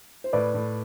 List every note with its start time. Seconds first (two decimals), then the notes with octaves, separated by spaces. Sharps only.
0.24 C5
0.33 A2 B4 D5
0.54 A2